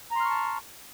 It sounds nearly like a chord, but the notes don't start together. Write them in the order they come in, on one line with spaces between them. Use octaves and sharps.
A#5 C6 F6 C#6 A5